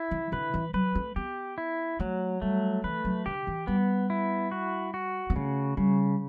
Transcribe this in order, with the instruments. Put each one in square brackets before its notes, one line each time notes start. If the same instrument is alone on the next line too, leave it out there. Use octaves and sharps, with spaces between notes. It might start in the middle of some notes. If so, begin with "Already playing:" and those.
Already playing: [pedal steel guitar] E4
[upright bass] E3
[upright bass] D3 [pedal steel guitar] B4
[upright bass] E3
[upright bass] F#3 [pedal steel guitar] B4
[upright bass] A3
[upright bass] B3 [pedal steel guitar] G4
[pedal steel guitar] E4
[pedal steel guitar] F#3 [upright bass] A3
[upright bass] G3 [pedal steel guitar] A3
[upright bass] E3 [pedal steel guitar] B4
[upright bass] F#3
[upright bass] D3 [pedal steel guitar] G4
[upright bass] E3
[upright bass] G3 [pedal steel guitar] B3
[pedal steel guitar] E4
F#4
F#4
[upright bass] B3
[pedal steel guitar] C#3 [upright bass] A3
[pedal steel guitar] C#3 [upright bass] G3